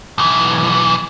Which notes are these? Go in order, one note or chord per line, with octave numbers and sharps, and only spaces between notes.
B1 E3